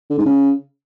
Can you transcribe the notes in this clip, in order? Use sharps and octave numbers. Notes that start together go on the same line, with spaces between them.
D3
G#2
C#3